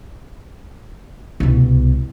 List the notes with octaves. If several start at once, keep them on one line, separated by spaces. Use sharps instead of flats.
C2 B2